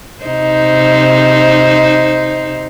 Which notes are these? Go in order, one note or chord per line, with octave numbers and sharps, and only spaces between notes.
C3 D#4 C5